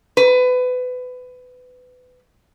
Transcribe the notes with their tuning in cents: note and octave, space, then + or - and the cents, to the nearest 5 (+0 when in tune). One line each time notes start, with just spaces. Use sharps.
B4 +25